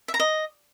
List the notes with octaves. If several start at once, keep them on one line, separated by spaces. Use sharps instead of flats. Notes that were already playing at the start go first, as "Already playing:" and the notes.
E5
A#5
D#5